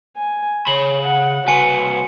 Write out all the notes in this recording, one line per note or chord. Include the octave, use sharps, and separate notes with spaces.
G#5
C#3 C#5 B5 F#7
F#5
C2 F#4 B4 G#5 C#7